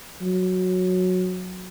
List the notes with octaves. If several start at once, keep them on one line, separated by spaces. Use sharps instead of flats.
F#3